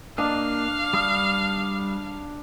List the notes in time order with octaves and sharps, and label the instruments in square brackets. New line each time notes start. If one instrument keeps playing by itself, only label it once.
[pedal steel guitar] A#3 D#5 [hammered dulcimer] D4 A5 [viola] F5
[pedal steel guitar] G3 D#6 F6